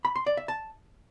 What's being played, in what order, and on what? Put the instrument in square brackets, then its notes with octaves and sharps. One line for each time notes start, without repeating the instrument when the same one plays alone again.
[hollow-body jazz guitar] B5
C6
D5
E5
A5